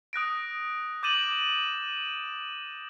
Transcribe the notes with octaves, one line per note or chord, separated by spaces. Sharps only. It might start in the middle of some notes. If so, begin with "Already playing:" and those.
D#6 F#6 A#6 D7
D6 G6 A6 D#7 E7 F#7